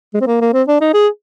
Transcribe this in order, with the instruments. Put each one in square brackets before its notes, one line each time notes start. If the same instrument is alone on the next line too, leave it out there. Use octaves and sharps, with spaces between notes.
[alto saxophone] G#3
C4
A#3
A#3
C4
D4
D#4
G#4